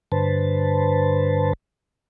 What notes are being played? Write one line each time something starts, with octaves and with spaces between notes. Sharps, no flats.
G2 D3 B4 C5 A5